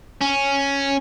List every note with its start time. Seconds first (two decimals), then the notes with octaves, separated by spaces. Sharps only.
0.21 C#4